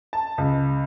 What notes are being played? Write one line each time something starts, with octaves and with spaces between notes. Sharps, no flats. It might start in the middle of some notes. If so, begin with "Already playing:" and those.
A5
C#2